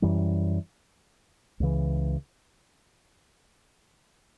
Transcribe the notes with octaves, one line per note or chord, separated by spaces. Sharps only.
F#2 E3 G3
C#2 C#3 E3